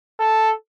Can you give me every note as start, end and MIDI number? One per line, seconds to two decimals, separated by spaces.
0.20 0.52 69